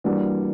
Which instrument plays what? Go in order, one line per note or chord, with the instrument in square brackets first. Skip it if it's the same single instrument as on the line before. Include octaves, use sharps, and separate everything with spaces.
[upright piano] E3 G3 A#3 D4 F#4